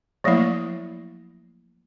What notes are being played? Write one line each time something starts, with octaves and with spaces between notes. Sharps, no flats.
F3 F#3 A3 A#3 E4